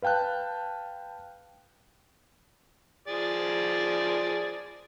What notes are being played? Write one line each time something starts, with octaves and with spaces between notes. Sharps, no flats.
B4 F5 G5 A5 F#6
F3 G#4 D5